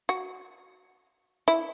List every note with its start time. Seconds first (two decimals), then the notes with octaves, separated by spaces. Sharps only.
0.09 F#4
1.48 E4